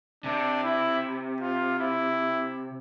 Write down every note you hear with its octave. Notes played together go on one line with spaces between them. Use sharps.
C3 D4
E4
F4
E4